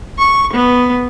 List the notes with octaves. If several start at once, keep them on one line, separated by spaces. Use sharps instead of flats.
C#6
B3